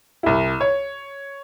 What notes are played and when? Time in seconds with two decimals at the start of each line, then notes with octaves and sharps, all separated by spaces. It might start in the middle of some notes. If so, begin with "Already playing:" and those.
0.23 C2 E4
0.61 C#5